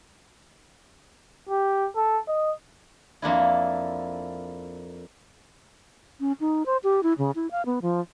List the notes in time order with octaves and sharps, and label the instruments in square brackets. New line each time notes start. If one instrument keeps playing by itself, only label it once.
[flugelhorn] G4
A4
D#5
[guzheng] F2 A#3 D4 E4
[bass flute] C#4
D#4
C5
G4
E4
C#3
E4
F5
B3
F3